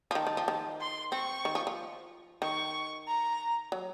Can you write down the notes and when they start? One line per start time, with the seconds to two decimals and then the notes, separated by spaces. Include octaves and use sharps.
0.11 F3
0.15 D#3 A5
0.27 D#3
0.37 F3
0.48 D#3
0.81 C6
1.12 C4 C#6
1.45 D#3
1.55 F3
1.67 F3
2.42 D#3 C#6
3.07 A#5
3.72 F#3